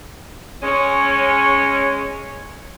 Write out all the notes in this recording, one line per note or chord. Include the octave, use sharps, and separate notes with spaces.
G#3 C#4